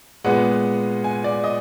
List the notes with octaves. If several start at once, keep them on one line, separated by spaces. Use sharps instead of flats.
A#2 G#3 B3 F#5
G#5
D5
D#5